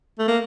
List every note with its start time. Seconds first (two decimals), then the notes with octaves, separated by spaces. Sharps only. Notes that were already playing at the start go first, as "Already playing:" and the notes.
0.19 A3
0.28 A#3